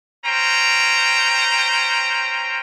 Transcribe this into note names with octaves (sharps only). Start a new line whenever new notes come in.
C#4 C5 G5 A#5